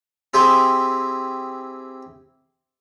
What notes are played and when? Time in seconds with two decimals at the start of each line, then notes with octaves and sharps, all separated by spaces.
0.34 C4 E4 G4 G#4 C5